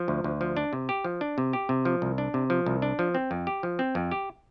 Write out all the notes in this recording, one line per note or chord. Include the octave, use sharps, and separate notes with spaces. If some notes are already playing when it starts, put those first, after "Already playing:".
Already playing: F3
D2
D2
F3
D4
C3
G4
F3
D4
C3
G4
C3
F3
C2
D4
C3
F3
C2
D4
F3
C4
F2
G4
F3
C4
F2
G4